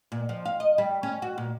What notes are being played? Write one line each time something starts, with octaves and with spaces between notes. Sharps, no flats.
A#2
F3
F5
D#5
G3
C#4
F#4
A#2